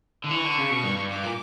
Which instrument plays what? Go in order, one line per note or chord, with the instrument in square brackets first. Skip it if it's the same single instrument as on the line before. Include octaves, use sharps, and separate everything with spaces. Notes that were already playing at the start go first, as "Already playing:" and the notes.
[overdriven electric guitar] D3
[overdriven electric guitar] E3 [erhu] C#6
[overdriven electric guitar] D3
C#3
B2
G2
G2
[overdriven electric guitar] G2 [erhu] D6
[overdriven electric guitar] A#2